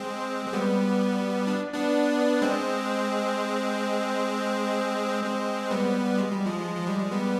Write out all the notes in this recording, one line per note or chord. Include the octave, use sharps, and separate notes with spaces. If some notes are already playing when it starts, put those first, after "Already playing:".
Already playing: G#3 C4
G#3
G3 B3
D4
B3 D4
G#3 C4
G#3 C4
G3 B3
G#3
G3
F3 G#3
F3
G3
G#3
G3 B3